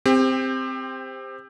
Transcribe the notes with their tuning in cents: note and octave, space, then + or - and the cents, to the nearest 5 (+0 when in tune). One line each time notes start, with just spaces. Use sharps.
C4 +0 G4 +30